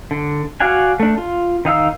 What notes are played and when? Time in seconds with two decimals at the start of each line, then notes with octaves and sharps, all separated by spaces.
0.11 D3
0.60 F#4 D5 F5 F#5 G#5
1.00 A3 D4
1.18 F4
1.65 D#3 D#4 F5 E6